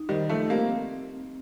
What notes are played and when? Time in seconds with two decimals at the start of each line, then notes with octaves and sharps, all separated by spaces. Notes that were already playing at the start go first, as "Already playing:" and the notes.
Already playing: D#4
0.09 D#3 G3 G4 C5 D#5
0.29 F3 A3
0.50 G3 A#3 C4